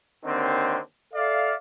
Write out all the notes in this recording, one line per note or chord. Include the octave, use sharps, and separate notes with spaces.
D#2 D3 D#3 C4
A4 D5 E5 F5